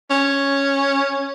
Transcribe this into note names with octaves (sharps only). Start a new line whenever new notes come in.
C#4